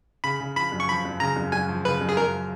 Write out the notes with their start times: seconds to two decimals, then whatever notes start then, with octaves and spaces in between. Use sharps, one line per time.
0.24 C#3 B5
0.40 C#3
0.56 F3 B5
0.72 F#2
0.80 C#6
0.88 F3 B5
1.05 F#2
1.20 C#3 A#5
1.36 F#2
1.52 F#2 G#5
1.69 F3
1.85 C#3 B4
2.01 F#2
2.09 G#4
2.17 F#2 A#4